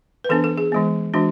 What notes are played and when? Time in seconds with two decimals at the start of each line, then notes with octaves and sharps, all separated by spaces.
0.24 B4
0.29 E3 B3 D4 A4
0.44 A4
0.58 G#4
0.72 E3 G#3 B3
1.14 E3 G#3 D4 F#4